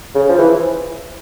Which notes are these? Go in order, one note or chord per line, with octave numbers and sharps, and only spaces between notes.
C#3
F3
E3